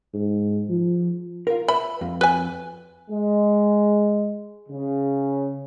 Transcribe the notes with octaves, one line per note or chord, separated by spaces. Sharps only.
G#2
F3
F4 A#4
B4 E5 B5
F2
B4 G#5
G#3
C#3